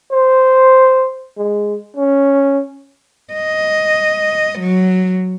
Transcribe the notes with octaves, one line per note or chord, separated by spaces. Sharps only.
C5
G#3
C#4
D#5
F#3